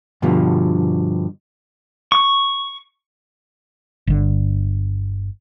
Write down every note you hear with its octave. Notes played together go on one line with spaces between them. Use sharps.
G2 B2 D3 F3
C#6
G1 D3